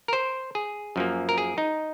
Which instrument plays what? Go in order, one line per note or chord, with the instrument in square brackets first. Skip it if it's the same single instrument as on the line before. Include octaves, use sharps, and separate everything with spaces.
[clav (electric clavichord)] A#4
C5
G#4
F#2 F3 A#3
A#4
G#4
D#4